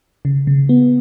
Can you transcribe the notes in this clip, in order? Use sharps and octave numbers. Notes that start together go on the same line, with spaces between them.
C#3
C#3
B3